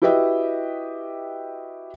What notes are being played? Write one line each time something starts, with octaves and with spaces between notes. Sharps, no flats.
E4 F#4 G4 B4 D#5 E5